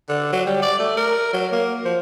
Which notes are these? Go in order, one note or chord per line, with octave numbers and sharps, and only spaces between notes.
D3
F#3
G3
D5
A3
A#4
F#3
A#3
F3